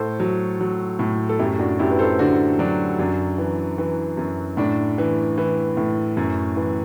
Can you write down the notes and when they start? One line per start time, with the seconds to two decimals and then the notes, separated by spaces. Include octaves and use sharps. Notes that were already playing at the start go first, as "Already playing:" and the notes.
Already playing: A2 A4 C5
0.20 F#3
0.61 F#3
0.99 A2
1.29 A4
1.39 F#2 E4 G4
1.59 D4 F#4
1.79 F#2 E4 G4
1.90 B4
1.99 A4 C5
2.19 D3 D4 F#4
2.59 F#3 D4
2.99 F#2 D4
3.38 E3
3.78 E3
4.17 F#2
4.57 A2 D4
4.98 E3
5.38 E3
5.77 A2
6.17 F#2
6.56 E3